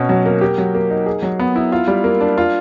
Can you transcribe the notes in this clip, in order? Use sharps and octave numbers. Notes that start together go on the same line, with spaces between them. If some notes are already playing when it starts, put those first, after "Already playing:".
Already playing: B2 C#4
F#3
A#3
G4
F#3
A#3
D#4
G#4
F#3
B3
E4
F4
G3
A#3
D4
F4